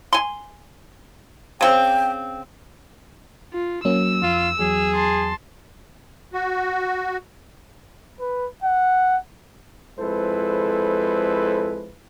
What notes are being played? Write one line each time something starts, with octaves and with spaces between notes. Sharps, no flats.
G#5 C6
C#3 C4 G5
F4
F#3 A#3 C#4 E6
F2 F4
E2 F#3 G#4
A5 C6
F#4
B4
F#5
F2 G#3 E4 A4 B4 C5